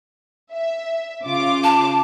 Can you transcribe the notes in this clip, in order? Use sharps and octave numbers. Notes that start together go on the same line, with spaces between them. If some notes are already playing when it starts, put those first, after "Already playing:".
E5
C#3 F4 D6
A5